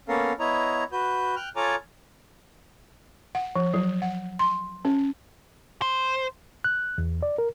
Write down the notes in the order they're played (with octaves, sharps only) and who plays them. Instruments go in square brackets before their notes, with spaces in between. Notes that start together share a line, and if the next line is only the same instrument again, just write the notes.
[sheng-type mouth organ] A#3 B3 C#4 A4 A#4 F5
B3 E4 C#5 D#5 A#5
F#4 B4 G6
G5 F6 F#6
F4 A4 C#5 G#5 A#5 D6
[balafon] F#5
F3
F#3
F#5
C6
C#4
[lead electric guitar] C5
[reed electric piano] F#6
E2
D5
A#4